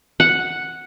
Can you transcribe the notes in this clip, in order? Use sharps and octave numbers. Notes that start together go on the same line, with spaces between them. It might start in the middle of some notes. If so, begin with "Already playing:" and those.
F#5